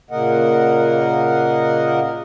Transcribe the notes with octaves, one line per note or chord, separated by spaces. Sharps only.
A#2 C#3 A#3 A#4 D#5 F#5